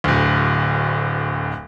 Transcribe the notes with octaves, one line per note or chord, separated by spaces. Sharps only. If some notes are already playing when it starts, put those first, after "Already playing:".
D1 D2